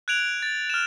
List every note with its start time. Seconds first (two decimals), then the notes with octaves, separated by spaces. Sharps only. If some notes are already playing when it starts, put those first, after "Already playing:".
0.08 F#6 G#6 D7 F7 F#7
0.42 A6
0.70 F6 E7